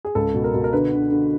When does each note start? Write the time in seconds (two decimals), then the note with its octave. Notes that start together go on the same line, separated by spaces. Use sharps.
0.05 G#4
0.15 C#2 A4
0.34 B2
0.44 A#4
0.54 B2
0.64 A#4
0.73 D3 B4
0.92 D3
1.10 D3